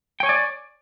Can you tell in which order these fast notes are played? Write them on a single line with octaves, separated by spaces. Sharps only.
G5 C#5 G#5 D5